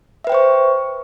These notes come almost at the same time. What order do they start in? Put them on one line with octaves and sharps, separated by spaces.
E5 B4 G5 C5 C#6